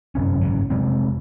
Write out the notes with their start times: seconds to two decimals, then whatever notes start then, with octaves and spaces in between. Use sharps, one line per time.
0.15 G1 F#2 C3 C#4
0.41 G#1 F#2 C#3
0.70 F1 C3 G#3 C4